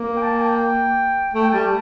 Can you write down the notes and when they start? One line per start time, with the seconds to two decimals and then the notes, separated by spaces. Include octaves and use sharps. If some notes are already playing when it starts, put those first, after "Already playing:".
Already playing: A#3
0.16 G5
0.22 A5
0.41 G5
1.34 A3 G5
1.45 G5
1.53 G3 A5